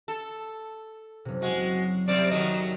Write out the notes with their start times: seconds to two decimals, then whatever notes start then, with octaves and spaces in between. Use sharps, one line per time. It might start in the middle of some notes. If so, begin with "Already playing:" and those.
0.08 A4
1.25 F#1 C3
1.42 F#3 G#3 F#4
2.08 C3 G3 C4 D5
2.31 D#3 F#3 A3 D#5